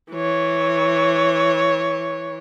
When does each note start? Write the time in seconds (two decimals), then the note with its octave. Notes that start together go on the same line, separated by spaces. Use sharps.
0.12 E3 C#5